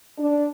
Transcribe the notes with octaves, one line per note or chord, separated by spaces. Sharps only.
D4